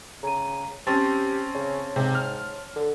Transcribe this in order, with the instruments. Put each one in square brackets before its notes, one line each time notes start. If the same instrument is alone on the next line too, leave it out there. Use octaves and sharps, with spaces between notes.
[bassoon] C#3 [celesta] A#5 D#7
[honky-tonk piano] C4 C#4 [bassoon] G4 [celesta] A5 C6 A6
[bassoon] C#3 [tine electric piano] C#5
[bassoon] G#2 [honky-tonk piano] C3
[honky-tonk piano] F6
[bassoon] D3